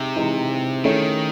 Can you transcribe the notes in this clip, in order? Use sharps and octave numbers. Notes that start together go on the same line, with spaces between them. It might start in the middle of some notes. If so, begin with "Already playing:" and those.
Already playing: C3 G#3 D#4
E3 G#3 D#4
D#3 A3 C#4 E4 G#4 C#5